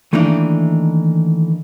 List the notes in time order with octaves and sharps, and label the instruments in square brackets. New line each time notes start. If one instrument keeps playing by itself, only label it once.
[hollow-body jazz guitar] D#3 E3 A3 A#3 D4 D#4